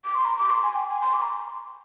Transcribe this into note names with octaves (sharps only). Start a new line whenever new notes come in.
D6
C6
A#5
D6
C6
G#5
G5
G#5
C6
D6
A#5